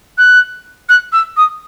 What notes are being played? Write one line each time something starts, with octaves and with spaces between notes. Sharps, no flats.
F#6
F#6
E6
D#6